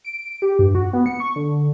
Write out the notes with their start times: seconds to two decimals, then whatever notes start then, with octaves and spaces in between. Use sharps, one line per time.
0.05 D7
0.42 G4
0.59 G2
0.75 F#4
0.93 B3
1.06 C#7
1.20 C#6
1.36 D3